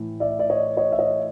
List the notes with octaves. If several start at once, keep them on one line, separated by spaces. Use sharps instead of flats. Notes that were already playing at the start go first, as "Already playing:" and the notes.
Already playing: A2 E3
D5 E5
D5
C#5 D#5
C#5 D#5
E5
C#5 D#5